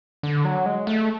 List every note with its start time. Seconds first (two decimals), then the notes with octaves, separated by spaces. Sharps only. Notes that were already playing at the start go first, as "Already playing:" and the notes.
0.23 D3
0.45 F#3
0.66 G#3
0.87 A3